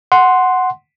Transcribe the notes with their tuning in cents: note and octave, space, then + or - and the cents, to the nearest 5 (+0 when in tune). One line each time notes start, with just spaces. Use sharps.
F#5 +0 C6 +0